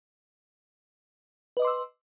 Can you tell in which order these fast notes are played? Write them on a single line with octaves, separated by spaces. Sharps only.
B4 D#5 D6 C6 E6